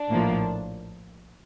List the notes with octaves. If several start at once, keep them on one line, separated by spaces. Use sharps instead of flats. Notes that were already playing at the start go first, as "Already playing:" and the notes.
Already playing: D4
A#1 A2 F3 A#3